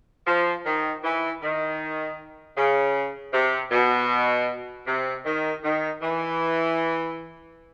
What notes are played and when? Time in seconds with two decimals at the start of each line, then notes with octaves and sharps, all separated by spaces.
0.26 F3
0.65 D#3
1.04 E3
1.42 D#3
2.57 C#3
3.33 C3
3.72 B2
4.87 C3
5.25 D#3
5.64 D#3
6.02 E3